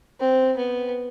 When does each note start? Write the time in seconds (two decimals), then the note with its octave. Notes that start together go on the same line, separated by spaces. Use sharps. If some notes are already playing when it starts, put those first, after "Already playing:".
0.20 C4
0.57 B3